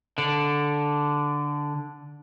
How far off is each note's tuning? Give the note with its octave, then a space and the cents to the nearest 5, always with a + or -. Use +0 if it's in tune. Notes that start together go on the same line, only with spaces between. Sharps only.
D3 -5